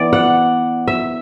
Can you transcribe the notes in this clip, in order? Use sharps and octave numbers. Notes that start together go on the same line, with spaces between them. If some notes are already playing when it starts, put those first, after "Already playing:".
Already playing: E3 B3 D5
F#5
E5